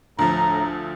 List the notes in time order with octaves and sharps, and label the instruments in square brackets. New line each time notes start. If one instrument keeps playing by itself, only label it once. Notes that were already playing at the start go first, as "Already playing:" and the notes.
[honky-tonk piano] D2 F3 [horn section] A2 A#5